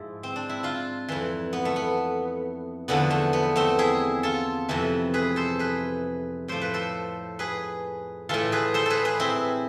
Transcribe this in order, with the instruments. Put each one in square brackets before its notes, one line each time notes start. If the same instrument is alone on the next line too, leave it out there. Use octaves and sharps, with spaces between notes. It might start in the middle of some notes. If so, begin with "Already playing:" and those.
Already playing: [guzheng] G#2 F3 E4
C4
D4
E4
D4 F4
F2 E3
B3
A3
B3
E2 D3 F3 B3
A3
B3
A3 C4
E4 G#4
F4 A4
F2 C3 E3
G#4 B4
A4 C5
G#4 B4
A2 F3 C5
B4
A4 C5
G#4 B4
A2 E3 F4 A4
G#4 B4
A4 C5
G#4 A4 B4
G#4 B4
C4 E4